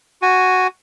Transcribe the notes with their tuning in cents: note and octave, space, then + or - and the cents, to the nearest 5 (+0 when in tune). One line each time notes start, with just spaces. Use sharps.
F#4 +0 G#5 +0